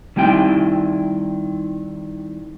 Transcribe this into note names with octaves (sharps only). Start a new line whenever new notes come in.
D#3 G3 C4 E4 G5